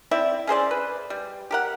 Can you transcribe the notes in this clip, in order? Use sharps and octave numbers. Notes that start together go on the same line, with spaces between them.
C4 E4 D5 E5
C#4 G#4 C5 D5
B4
G3
G4 A#4 F#5